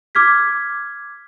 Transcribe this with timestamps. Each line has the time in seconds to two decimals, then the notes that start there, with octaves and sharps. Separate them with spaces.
0.15 D6 F6 G#6 B6